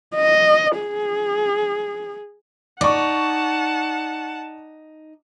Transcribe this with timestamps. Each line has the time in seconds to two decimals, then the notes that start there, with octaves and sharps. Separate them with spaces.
0.16 D#5
0.79 G#4
2.81 D#4 D5 F#5 A5 C#6